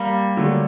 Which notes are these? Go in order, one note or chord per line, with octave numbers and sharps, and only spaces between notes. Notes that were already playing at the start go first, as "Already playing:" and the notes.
Already playing: G3 A#3
D3 F#3 A3 D4